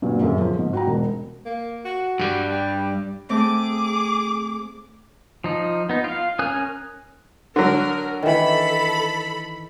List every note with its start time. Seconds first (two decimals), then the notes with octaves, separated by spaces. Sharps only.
0.02 G2 A#2 F#3
0.21 D#1 F#2 G#4 A#4
0.39 F3
0.59 G#2
0.73 F#4 G5 A#5
0.87 E1
1.46 A#3
1.85 F#4
2.20 G2 G3
2.51 G4
3.30 A3 C4 G#4 D6
5.44 F3 D#4
5.89 B3 D#4
6.04 F4 F5
6.39 C#4 A#4 G#5 D#6 F#6
7.56 D3 F#3 A#4
8.22 D#3 E3 A4 B5